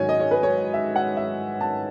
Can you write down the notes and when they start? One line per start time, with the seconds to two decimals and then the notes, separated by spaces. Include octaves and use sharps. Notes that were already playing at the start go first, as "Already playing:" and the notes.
Already playing: G#2 D#3 F#3 C#5 G#5
0.09 D#5
0.20 C#5
0.31 B4
0.43 C#5
0.74 E5
0.96 F#5
1.17 E5
1.61 A5